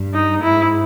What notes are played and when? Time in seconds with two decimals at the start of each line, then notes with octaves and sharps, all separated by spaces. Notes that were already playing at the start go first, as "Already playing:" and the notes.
Already playing: G2
0.14 D#4
0.42 G#2 E4